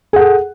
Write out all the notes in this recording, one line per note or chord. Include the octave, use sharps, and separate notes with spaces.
G#4 A4 F#5